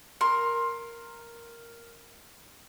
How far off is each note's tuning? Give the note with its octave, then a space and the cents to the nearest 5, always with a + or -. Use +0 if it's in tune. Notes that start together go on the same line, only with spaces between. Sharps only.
A#4 +0 C6 +15